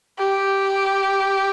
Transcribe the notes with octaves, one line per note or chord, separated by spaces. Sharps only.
G4